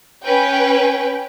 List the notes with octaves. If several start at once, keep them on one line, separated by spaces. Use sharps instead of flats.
C#4 B4 G5